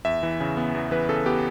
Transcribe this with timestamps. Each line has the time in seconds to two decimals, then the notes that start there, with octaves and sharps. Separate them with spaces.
0.05 E2 E5
0.23 E3
0.40 C#3
0.57 B3
0.75 E2
0.91 E3 B4
1.09 C#3 A4
1.25 B3 G4